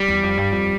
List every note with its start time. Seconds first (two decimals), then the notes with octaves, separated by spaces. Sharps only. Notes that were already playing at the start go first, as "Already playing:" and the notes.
Already playing: G3
0.08 E2
0.23 F2
0.37 G2
0.52 F2